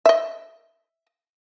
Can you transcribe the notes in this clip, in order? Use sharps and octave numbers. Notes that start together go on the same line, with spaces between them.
D#5 E5